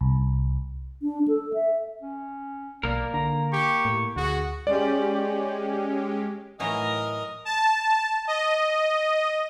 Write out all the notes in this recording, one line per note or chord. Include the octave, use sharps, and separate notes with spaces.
C2
D4
A4
E5
C#4
B1 A#3 A#4 D5
D3 A#5
G4 C#6
A2
D2 F#4 G#4
G#3 C#4 G4 D5
A2 E3 F#3 D#4 A#4 D#5 D#6
A5
D#5